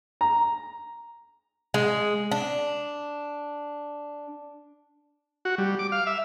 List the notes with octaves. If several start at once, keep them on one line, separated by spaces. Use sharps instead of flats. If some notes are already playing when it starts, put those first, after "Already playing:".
A#5
G#3
D4
F#4
G3
D6
F5
E5